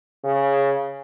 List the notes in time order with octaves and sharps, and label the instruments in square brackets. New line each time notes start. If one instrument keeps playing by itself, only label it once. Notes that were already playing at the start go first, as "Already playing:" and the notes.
[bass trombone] C#3